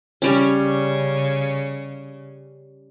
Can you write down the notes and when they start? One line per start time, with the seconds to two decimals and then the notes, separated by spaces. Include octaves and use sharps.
0.22 C#3 G3 C#4